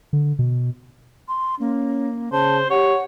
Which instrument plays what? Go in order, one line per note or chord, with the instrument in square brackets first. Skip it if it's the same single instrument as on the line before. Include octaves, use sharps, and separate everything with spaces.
[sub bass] D3
B2
[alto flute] C6
[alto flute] A#3 [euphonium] C#4
[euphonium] C#3 [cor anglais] C5 [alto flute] A5
[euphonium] G4 [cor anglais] C#5 [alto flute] F#5